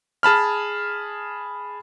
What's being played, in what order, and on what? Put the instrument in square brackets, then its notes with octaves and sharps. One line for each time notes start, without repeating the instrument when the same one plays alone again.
[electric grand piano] G#4 A5 B5 F6